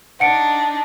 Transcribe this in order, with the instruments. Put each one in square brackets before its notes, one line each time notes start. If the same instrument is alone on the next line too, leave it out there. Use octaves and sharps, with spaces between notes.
[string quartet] D4 D#4 [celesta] F#5 C#7 D7